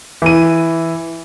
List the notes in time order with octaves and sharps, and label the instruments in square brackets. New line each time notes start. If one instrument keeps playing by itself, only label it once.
[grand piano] E3 D#7